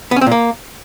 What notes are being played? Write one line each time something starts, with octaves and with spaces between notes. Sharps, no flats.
B3
C#4
C4
A#2
A#3